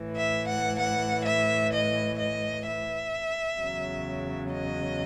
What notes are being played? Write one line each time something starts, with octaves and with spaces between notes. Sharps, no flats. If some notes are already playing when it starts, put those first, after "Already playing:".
Already playing: A2 E3
E5
F#5
F#5
E5
D#5
D#5
E5
E2 C#3 F#3
D#5